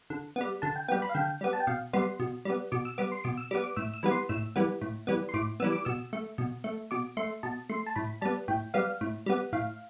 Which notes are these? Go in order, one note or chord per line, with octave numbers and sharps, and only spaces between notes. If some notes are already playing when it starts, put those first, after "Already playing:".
D3
G3 B3
D3 A5
G5
G3 B3 G5
B5
F5
D3 G5
G3 B3
A5
G5
B2 F5
G3 B3 C6
B2
G3 B3
B2 D6
E6
G3 B3 D6
C6
B2 D6
E6
G3 B3 D6
D6
A2 E6
E6
E3 G3 B3 B5
C6
A2 E6
E3 G3 B3
A2
E3 G3 B3
C6
A2 D6
E3 G3 B3 E6
D6
B2 E6
A3
B2
A3
B2 D6
A3 C6
B2 A5
A3 C6
A5
A2 B5
G3 B3 A5
A2 G5
G3 B3 F5
A2
G3 B3
A2 F5